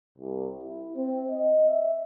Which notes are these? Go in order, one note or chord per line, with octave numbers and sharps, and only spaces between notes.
C2
E4
C4
D#5
E5